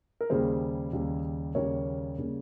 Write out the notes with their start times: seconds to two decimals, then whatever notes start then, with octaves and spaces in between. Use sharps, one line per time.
0.21 A#4
0.30 D#2 C#3 G3 A#3 G#4 C5
0.93 D#2 C#3 G3 A#3
1.55 D#2 C#3 G3 A#3 A#4 C#5
2.18 C#3 G3 A#3